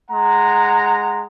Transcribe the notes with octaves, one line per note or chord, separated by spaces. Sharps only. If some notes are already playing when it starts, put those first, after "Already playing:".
G#3 F#5 A#5